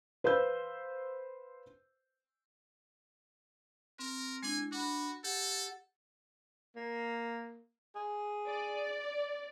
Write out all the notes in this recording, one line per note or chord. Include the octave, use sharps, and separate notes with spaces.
B4 C5 F5 E6 G6
C4 A#4
G#3 D4 E4 G#5
D4 F#4 F#5 B5
G4 A4 F#5
A#3
G#4
D5